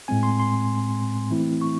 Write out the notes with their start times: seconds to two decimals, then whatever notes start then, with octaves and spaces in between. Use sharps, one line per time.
0.08 A2 G#3 C4 G#5
0.23 C6
0.40 C6
1.31 E3 A3 C4 E4
1.61 C#6